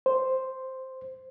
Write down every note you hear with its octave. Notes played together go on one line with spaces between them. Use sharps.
C5